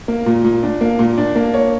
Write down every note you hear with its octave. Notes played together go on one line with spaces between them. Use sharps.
A#3
A#2
A#2
D4
A#3
A#2
D4
A#3
C#5